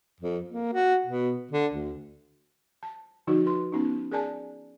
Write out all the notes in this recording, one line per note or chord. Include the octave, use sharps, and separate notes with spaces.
F2
A#3
F#4
B2
D3
D2
A5
D3 F3 D#4 F#4
B4 C6
B3 C#4 D#4
G#4 A#4 D5 G#5 A5